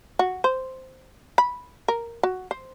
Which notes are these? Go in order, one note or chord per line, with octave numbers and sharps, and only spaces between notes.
F#4
C5
B5
A#4
F#4
C5